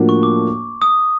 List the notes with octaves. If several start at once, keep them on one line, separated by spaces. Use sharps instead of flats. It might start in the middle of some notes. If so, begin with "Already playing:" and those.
Already playing: A2 F3 A#3 D4 F#4
C#6
D6
D#6